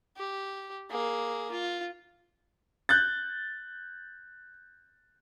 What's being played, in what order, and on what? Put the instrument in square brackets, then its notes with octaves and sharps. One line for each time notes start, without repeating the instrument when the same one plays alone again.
[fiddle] G4
A#3 G#4
F4
[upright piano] F#6 G6 A6